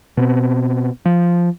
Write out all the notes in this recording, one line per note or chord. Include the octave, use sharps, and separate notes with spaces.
B2 C4
F3